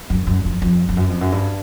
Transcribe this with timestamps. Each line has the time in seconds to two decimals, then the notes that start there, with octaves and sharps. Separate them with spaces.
0.10 F#2
0.27 F#2
0.45 F2
0.62 F2
0.89 F2
0.97 F#2
1.09 F2
1.21 F#2
1.32 G2